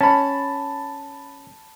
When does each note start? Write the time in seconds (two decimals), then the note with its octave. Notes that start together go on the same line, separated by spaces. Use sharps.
0.01 C#4 A5 B5